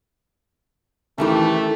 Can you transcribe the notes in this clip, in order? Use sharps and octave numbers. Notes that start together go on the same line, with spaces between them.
D#3 E3 A3 C#4 D#4 E4 G4 A4